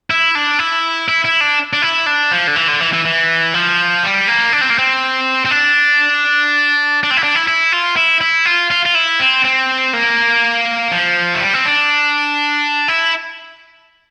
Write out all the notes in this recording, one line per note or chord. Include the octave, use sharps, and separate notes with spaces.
E4
D4
E4
E4
E4
D4
D4
E4
D4
F3
D3
E3
D3
E3
E3
E3
F3
G3
A#3
D4
C4
A#3
C4
C4
D4
D4
C4
E4
D4
E4
E4
F4
E4
E4
F4
F4
F4
E4
C4
C4
A#3
F3
A3
G3
C4
D4
E4